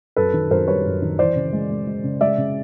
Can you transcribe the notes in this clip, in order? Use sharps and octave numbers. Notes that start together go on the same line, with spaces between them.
F#2 A4 B4
D#3
F#2 A#4 C5
G3 B4 C#5
F#2
D#3
E3 C5 D5
C#3
G#3
G#3
G#3
C#3
G#3 D5 E5
C#3